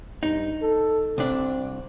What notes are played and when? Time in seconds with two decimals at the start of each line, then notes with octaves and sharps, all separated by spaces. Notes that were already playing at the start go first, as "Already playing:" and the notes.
0.23 G2 D#4
0.62 A4
1.18 C2 C4 D4